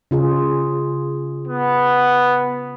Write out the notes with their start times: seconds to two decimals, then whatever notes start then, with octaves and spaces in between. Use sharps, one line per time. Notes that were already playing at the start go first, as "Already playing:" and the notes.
0.11 C#3 F4 G#4
1.47 B3